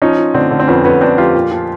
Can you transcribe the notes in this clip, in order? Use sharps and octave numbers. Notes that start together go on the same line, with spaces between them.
F3 C#4 D#4
F3
D3 C4 D4
D3
C4
F2 B3 C#4
F2 B3 C#4
F2 C4 D4
F2 F4 G4
A#2
F3